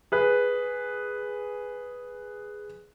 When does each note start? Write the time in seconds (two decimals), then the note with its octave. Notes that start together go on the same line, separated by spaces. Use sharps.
0.12 G#4 B4